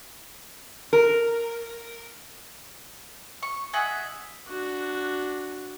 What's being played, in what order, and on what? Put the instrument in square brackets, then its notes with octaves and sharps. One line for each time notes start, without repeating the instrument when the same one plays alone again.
[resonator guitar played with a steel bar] A#4
[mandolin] C#6
G#4 D#5 E5 F#5
[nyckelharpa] D4 F#4